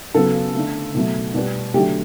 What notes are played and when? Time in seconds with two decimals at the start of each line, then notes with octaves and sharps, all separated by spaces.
0.14 C#3 F#3 B3 A4
0.54 D3 A3
0.94 B2 F#3 A3
1.34 B2 G3 B3
1.74 D3 F#3 A3 G4